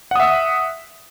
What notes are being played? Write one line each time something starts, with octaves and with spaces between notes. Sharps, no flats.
E5 F#5 D#6